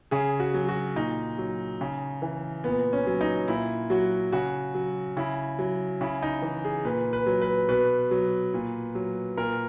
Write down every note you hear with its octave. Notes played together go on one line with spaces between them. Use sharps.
C#3 G#4
F#4
F#3
F#4
A#2 D#4
F#3
C#3
E3
A#2 B3
C#4
F#3
D#4
A#2 E4
F#3 F#4
C#3 F#4
F#3
C#3 E4
F#3
C#3 E4
D#4
E3
G#4
A#2 B4
B4
F#3
B4
B2 B4
F#3
A#2
F#3
A#2 A#4